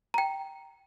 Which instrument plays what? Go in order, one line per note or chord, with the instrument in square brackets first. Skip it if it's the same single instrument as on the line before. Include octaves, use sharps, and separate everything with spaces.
[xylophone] G5 A#5